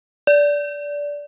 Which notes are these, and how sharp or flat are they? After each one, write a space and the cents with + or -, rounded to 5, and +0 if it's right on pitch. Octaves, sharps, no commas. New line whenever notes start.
D5 -15